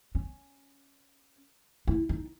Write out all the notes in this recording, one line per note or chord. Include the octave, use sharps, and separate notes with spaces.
C#4
E4
D#4